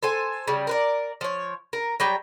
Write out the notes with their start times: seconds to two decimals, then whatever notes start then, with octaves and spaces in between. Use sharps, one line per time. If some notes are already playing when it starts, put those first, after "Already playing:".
0.03 A4 C5 G#5
0.48 C#3 G3
0.67 A#4 B4 D5
1.21 F3 C#5
1.73 A#4
2.00 F#3 G3 G5